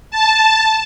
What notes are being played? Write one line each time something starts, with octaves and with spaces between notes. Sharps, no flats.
A5